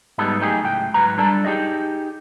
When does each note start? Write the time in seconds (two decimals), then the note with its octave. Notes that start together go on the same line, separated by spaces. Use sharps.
0.18 G#2 G3 B3 D#4 A4
0.39 F#3 A3 D#4 G4 G#4
0.63 C#2 A2 G5
0.94 G#2 F#3 B4 A#5
1.18 G3 D4 A4 D5 A5
1.45 D#4 G4 G#4 D#5